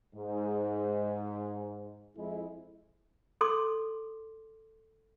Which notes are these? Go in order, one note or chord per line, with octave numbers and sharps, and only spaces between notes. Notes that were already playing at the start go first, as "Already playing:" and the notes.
G#2
F2 G#3 E4
A4 C6 D6